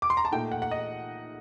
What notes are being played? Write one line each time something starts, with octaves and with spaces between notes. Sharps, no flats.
D6
C6
A#5
A5
A#2 A3 D#4 G5
F#5
F#5
D#5